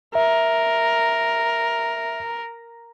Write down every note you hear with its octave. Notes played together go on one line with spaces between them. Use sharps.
A#4 E5